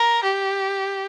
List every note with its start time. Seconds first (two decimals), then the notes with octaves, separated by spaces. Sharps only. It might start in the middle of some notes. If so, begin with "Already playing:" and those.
Already playing: A#4
0.23 G4